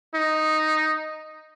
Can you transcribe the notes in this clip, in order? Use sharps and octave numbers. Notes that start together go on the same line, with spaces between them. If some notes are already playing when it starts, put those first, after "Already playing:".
D#4